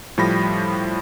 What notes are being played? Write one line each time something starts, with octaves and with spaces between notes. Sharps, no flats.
A2 F3 G3 B5 A#6